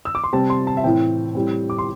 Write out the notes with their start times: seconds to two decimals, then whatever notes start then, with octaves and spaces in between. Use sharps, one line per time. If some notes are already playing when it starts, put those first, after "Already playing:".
0.05 E6
0.15 D6
0.24 C6
0.33 C3 G3 C4 A5
0.50 C6
0.67 A5
0.77 E5
0.84 A2 E3 C4 G5
1.35 A2 G3 C4
1.70 D6
1.78 C6